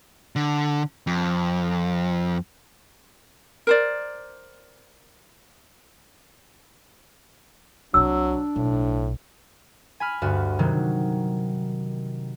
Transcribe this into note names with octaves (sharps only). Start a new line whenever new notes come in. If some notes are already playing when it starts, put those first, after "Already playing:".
D3
F2
A#4 C5 D5
C2 C3 F#3 D4 E6
B1 A2
G#5 B5 F6
D2 G2 F#4
C3 D#3 F#3